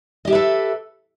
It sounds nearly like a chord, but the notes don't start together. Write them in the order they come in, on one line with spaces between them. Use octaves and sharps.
D#5 G4 E5 B4 A4